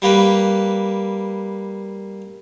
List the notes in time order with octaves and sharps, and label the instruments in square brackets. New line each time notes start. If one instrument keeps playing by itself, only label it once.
[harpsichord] G3 A#3 B4